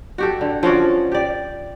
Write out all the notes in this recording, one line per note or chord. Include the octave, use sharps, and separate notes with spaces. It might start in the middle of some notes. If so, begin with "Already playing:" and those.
F#4 G4 A4
D3
F3 C#4 F#4 D5
G4 D5